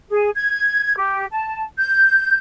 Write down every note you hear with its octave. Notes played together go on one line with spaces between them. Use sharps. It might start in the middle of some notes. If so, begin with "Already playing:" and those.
G#4
G#6
G4
A5
G6